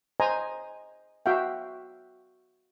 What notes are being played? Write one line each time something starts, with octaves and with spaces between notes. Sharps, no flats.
C5 D#5 G#5 A#5
F#4 E5 F5 G5